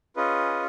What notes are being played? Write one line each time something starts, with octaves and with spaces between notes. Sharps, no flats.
C#4 F4 G#4 B4 D#5